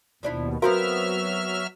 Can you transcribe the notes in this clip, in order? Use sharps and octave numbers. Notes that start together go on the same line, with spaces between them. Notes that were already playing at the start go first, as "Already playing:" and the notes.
D#2 B2 F3 D4 E4
F#3 B3 C4 F#4 A#4 E5 F5 F6